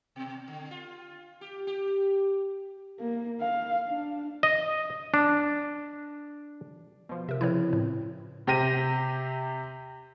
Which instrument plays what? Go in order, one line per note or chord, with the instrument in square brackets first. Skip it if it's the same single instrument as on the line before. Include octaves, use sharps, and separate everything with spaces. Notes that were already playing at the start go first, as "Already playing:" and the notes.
[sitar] B2
D3
F4
G4
G4
[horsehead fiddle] A#3
F5
D4
[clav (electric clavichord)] D#5
D4
[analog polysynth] B2 F3
[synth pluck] C3 A#4 [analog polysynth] E5
[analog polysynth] C#3 F3 C4 [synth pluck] E4 B4 C#5
[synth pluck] A2
[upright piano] C3 G4 C5 A#6 D#7